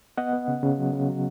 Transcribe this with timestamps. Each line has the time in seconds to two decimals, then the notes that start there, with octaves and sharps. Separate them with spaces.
0.17 B3 D#5 F#5
0.33 B3
0.48 C#3
0.63 C#3
0.78 F#3
0.93 C#3
1.08 F#3